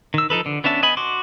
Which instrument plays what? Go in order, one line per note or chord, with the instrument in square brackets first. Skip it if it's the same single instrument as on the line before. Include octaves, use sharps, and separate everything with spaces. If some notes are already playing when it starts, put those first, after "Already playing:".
[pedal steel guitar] D#3 E6
F3 D#4 A4 B4
D3
B3 C#4 D4 E5 A5
B3 D#5 G#5 B5
F#4 C6 D6